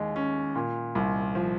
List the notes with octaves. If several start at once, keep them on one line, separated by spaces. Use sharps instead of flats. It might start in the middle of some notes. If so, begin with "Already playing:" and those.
Already playing: D#2 G#3
C#4
A#2
C2
F3